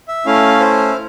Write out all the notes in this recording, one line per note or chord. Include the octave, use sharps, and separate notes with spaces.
E5
A3 C#4 E4 F5
C5